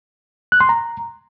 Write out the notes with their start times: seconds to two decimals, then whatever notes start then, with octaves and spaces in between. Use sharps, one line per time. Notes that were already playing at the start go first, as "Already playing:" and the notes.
0.52 F#6
0.61 C6
0.69 A#5